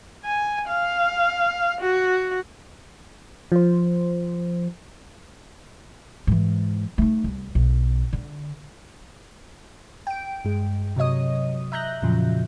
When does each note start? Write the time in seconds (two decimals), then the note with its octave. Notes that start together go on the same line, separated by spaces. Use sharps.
0.25 G#5
0.68 F5
1.81 F#4
3.52 F3 C5
6.27 G#2 E3
6.98 A3 D#4
7.24 C2
7.55 B1
8.13 D3
10.07 G5 D7
10.45 G2 G#3
10.96 C3 F#3 C#5 D#5 D#6
11.72 E5 A#5 F#6 G6 A#6
12.02 F2 A#2 C#3 F3 F#3